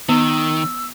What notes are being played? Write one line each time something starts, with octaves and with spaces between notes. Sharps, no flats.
D#3 B3 E6